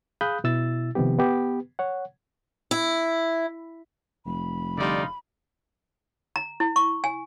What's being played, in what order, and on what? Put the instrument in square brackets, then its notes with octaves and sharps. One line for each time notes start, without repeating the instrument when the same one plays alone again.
[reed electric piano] G#4 F5 B5 D#6 F#6 G6
B2 E4 E6 A6
C3 D#3 F3 B3 G4
B3 G4 B4
C#5 F#5
[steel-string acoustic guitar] E4
[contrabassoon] F1 [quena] B5
[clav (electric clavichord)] D3 G3 [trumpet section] D#4 F4 D5
[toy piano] A#5
E4
C#6
G#5